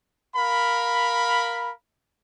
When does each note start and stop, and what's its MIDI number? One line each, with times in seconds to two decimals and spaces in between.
0.36 1.73 70
0.36 1.73 77
0.36 1.73 83